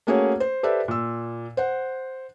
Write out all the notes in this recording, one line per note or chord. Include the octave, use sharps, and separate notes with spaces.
A3 A#3 C#4 F#4 G#4 C#5
C5
G4 A4 B4 C5 D5 E5
A#2 E6
C5 F#5